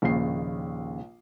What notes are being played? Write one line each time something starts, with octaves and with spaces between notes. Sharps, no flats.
A#1 D#2 C#3 C7